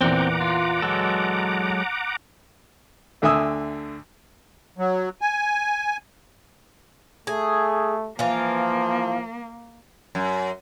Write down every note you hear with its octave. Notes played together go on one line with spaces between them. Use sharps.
E2 A#2 E3 C4 F#5 A#5 D6
F4
F#3 G#3 A4
D2 D3 E5 G#5 D#6 E6
F#3
G#5
A3 G#4
E3 F3 A#3 F4
F#2